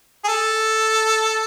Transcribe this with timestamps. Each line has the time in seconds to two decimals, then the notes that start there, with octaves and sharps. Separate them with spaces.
0.24 G#4
0.28 A4